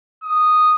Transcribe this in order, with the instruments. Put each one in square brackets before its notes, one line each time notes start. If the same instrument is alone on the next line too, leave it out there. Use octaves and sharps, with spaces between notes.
[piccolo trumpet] D#6